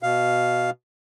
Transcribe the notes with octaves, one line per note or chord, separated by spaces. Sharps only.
B2 F5